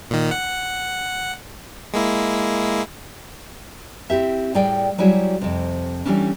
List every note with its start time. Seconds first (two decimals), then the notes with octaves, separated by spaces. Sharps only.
0.10 A#2 D#3
0.31 F#5
1.94 G#3 A#3 E4
4.10 C4 E4 G4 E5
4.55 A2 G3 G#4 D5 G5
4.98 F#3 G3 E4 F#4 G#4
5.41 F2 C3
6.06 E3 G3 A3 C#4 D4